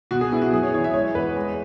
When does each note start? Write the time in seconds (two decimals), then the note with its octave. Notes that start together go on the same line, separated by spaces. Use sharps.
0.11 B2 F#4
0.21 G#4
0.32 B3 E4
0.42 F#4
0.53 F#2 G#4
0.63 C#5
0.74 E3 C#5
0.84 E5
0.94 G#3 C#5
1.15 E2 B4
1.36 G#3